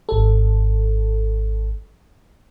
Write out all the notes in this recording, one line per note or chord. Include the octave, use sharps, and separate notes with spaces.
G#1 A4